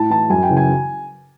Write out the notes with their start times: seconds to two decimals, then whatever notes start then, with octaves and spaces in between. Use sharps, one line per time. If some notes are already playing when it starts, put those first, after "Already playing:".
Already playing: A2 A5
0.10 E3 A5
0.30 F#2 G#5
0.43 G5
0.49 C#3 E3
0.57 G#5